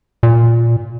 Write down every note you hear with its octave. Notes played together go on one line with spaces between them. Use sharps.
A#2